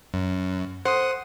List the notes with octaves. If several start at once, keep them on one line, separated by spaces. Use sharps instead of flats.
F#2
C5 F#5 D#6